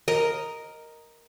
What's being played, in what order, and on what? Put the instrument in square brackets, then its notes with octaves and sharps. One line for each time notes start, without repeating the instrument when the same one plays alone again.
[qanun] A#4 D#5